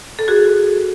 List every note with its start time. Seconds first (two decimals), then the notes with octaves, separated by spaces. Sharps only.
0.19 A4
0.28 F#4 G#4